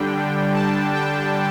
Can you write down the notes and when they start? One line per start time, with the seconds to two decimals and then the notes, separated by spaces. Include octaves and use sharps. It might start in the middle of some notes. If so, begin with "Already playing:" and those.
Already playing: D3 G3 D4 G5
0.55 A5
0.94 G5